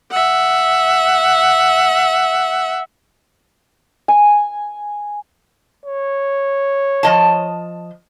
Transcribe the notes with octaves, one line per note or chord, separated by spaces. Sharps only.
E5 F#5
G#5
C#5
F3 D#5 A5